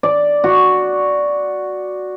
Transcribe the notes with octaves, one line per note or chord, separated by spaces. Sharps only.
D5
F#4